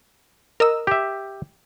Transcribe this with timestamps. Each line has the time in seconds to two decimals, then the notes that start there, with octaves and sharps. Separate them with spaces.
0.60 A#4 D#5 E6
0.87 G4 E5